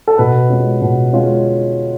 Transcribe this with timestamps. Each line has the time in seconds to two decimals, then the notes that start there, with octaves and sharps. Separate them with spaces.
0.07 A4
0.18 B2 B4
0.50 G#3 C#4 F4
0.82 B2
1.13 G#3 C#4 F4